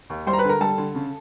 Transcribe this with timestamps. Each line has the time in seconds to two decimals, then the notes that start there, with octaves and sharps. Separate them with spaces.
0.10 D#2
0.27 G3 C5 C6
0.33 A#5
0.38 B4 B5
0.44 D3
0.49 A#4 A#5
0.61 G3 A4 A5
0.78 D3
0.95 C#3